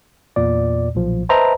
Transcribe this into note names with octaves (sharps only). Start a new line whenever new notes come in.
E2 A#2 D5
B1 A#2 F3
B4 C5 D#5 E5 A5 A#5